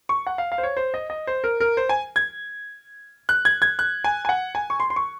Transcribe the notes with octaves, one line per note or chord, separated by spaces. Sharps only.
C#6
F#5
F5
F5
C5
C#5
C5
D#5
D#5
C5
A#4
A#4
C5
G#5
G#6
F#6
G#6
G#6
F#6
G#5
G#5
F#5
G#5
C#6
C6
C6
C#6